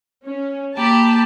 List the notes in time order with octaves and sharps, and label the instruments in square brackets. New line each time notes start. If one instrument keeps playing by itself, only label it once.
[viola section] C#4
[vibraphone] A#3 [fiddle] G4 [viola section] A5 B5